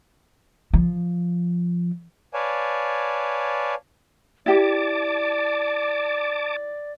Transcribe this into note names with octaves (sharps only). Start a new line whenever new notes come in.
F3
B4 C#5 D5 F5 G#5 A5
E4 G4 D5 A5 D6